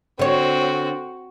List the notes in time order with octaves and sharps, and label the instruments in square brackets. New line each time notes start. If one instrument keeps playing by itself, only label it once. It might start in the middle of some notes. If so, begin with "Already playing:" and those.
[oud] D3 C#5 [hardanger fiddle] C4 F#4